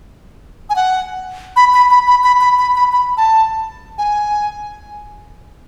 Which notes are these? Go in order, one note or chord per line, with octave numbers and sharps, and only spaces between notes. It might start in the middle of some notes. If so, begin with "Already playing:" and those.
G#5
F#5
B5
B5
B5
B5
B5
B5
B5
B5
B5
A5
G#5